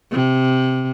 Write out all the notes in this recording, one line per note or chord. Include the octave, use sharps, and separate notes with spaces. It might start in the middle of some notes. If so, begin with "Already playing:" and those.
C3